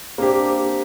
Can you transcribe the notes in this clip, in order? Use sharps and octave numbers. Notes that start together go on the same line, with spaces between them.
A#3 C4 D4 G4